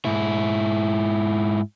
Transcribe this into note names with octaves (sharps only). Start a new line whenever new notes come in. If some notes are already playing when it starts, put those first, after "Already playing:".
G#2 E4